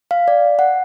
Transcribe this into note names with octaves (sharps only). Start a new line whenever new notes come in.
F5
D5
F#5